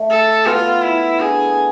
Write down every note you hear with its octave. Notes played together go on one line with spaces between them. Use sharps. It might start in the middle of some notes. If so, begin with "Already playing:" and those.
Already playing: A3
A4
B3 F4
E4
D4 G#4